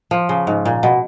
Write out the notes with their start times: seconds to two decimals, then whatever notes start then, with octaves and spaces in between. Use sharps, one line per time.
0.11 F3
0.29 C#3
0.47 G#2
0.65 A#2
0.83 B2